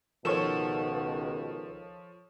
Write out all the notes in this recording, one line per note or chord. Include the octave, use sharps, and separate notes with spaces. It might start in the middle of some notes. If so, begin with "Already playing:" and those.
C#2 B2 D#3 F3 A4 C#5 C#6 E7